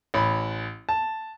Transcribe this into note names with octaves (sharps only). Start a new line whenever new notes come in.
A1 B5
A5